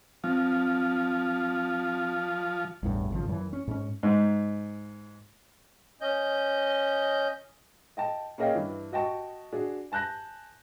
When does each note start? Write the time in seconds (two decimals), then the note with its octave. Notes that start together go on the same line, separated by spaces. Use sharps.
0.24 F3 C4
2.83 A1 E2 G2
3.10 G#1 C#3 F3
3.28 F#2 E3
3.53 C#4
3.67 G#2 C#4
4.03 G#2
6.01 C#4 D#5 G6
7.97 D#5 G5 A5
8.38 A#3 C#4 G#4 D#5 F5 G5
8.55 G2 E3
8.92 F#4 D#5 G5 A5 C#6
9.53 D4 F#4 G#4
9.92 G#5 A5 F#6 G6 A#6